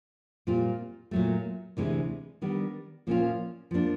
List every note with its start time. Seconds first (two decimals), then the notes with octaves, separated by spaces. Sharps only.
0.47 A#2 G3 C4 F4
1.11 A#2 F#3 A3
1.77 D2 C3 E3 G#3 C4
2.42 D#3 G3 B3 D4
3.07 A#2 F3 A#3 C#4 F4
3.71 F3 A#3 D4